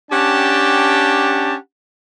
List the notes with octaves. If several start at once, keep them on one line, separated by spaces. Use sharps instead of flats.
C#4 D4 G4 F#5 G5 A5